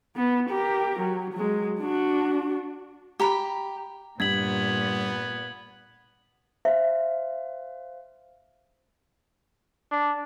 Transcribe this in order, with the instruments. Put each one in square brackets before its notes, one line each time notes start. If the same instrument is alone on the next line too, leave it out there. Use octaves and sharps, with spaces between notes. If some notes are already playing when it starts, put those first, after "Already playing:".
[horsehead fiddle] B3
G4 A#4
F#3
F#3 G#3
D4 F#4
[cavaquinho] G4 A#5 B5
[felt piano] G2 B6 [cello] A#2 [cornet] B3 [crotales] G#6 F#7
[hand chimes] C5 F5 [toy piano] E5
[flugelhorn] D4